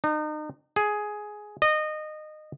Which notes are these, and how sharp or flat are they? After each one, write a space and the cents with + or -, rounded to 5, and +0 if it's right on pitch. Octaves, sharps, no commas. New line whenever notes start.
D#4 -35
G#4 +10
D#5 -20